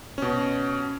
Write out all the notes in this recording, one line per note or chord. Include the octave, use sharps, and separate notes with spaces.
B2 C#4